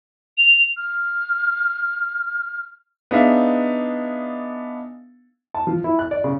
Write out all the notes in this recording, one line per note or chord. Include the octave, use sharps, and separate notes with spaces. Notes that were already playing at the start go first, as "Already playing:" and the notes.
F7
F6
B3 D4 D#4 G#4 E5 F5
A5
F3
E4
F#6
D5
C#3